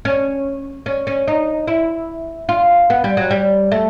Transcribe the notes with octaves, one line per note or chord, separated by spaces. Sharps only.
C#4
C#4
C#4
D#4
E4
F4
B3
G3
F#3
G3
A3